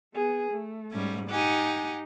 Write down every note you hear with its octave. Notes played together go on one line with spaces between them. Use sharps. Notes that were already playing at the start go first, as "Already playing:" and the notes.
B3 G#4
A3
G#2 G3 C#4
D#4 G4 F#5 G#5